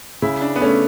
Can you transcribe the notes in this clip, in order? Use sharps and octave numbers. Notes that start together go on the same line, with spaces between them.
C#3 E4
D4
B3
A3 C#4